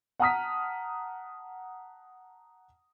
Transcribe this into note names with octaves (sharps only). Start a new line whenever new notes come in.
F#5 A5 A#5 D#6 F6 B6